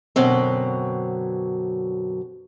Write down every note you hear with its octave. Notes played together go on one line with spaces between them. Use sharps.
F#2 B2 D3 F#3 C4